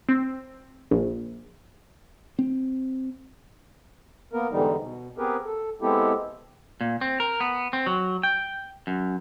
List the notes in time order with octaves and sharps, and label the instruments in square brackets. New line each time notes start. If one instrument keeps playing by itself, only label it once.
[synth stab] C4
A#1
[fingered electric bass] C4
[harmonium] A#3 B3 A#4
E2 G#2 D3 E3 G3 D#4
B2
B3 C4 G4 G#4 A#4 B4
A4
G#3 B3 C4 E4 G4 A4
[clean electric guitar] A#2
C4
A#4
B3
C4
F#3
G5
F#2